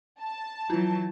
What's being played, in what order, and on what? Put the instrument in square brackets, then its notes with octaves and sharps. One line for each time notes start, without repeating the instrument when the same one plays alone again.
[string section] A5
[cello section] E3 F#3 [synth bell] E4 F4